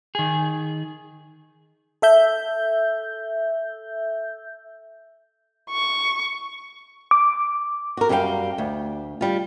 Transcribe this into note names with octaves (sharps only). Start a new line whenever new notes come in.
D#3 G#4
A4 E5 G6
C#6
D6
F#4 A#4
F#2 G3 E4 A4 F5 G5
D2
G3 F4